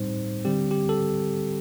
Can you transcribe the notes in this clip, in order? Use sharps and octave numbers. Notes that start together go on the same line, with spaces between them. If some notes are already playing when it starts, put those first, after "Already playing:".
Already playing: A2 G3 C4 D#4 C5
D3 G3 C4 G4
G4
A4